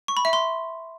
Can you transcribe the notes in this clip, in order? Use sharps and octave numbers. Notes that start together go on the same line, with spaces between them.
C#6
B5
E5
C6